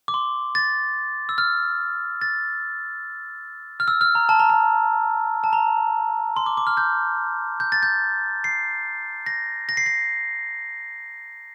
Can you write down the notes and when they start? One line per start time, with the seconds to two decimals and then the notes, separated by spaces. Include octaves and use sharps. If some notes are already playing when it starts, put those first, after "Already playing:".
0.08 D6
0.14 C6
0.55 A6
1.29 E6
1.38 F6
2.21 A6
3.80 F6
3.88 E6
4.01 F6
4.15 A#5
4.29 A5
4.39 A#5
4.50 A5
5.44 A5
5.53 A#5
6.36 C6
6.46 D6
6.57 D6
6.67 F6
6.77 G6
7.60 G6
7.72 A6
7.83 G6
8.44 C7
9.26 A#6
9.69 A#6
9.77 C7
9.86 A#6